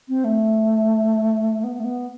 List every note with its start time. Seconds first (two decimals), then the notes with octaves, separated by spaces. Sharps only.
0.08 C4
0.24 A3
1.64 B3
1.79 A3
1.84 B3